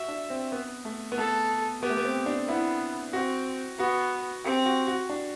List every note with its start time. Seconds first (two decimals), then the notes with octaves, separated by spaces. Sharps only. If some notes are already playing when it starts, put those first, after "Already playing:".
Already playing: F#4 E5
0.08 D4
0.30 C4
0.52 B3
0.85 A3
1.12 B3
1.17 A3 A4
1.82 B3 G4
1.90 A3
1.97 B3
2.05 C4
2.26 D4
2.48 B3 E4
3.13 C4 F#4
3.79 B3 F#4
4.44 C4 G4
4.66 F#4
4.88 F#4
5.10 D4